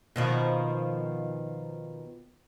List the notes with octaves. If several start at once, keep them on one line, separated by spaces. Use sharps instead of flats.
B2 D#3 F3